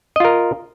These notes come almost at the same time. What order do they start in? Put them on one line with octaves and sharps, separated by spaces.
D#5 F4 A#4